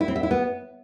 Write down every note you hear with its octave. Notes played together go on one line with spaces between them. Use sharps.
E4
C4
E5
E4
B3